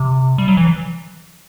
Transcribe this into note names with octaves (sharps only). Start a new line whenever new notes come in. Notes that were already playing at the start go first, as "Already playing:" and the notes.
Already playing: C3
G3
F#3
E3